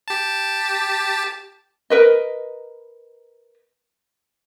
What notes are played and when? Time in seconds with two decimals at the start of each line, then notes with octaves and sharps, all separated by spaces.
0.08 G4 A5
1.90 A#4 B4 D#5